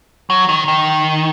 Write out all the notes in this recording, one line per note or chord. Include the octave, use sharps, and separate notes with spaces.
F#3
D#3
D#3